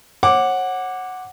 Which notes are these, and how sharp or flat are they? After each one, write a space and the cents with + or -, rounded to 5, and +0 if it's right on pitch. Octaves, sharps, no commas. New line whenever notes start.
C#5 -40 F#5 +0 D6 +0